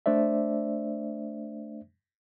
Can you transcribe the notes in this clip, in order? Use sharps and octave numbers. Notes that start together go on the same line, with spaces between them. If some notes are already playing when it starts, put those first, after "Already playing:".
A3 D4 C5 D5 E5